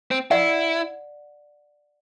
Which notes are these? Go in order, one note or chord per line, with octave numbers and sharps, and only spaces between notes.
C4
E4 D5 F#5